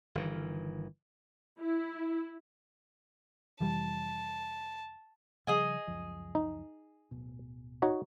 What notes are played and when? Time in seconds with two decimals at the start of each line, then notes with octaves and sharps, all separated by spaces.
0.15 G1 D#3 E3
1.59 E4
3.60 F1 E3 G3 A5
5.47 C#3 F3 G3 G#4 D#5 G#5
5.87 C#2 F#2 F3
6.35 D#4
7.11 D1 B2
7.82 D#4 F#4 C#5